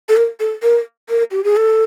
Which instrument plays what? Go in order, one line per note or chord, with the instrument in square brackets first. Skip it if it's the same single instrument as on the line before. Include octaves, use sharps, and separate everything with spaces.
[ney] A4
A#4
A4
A#4
A#4
G4
G#4
A4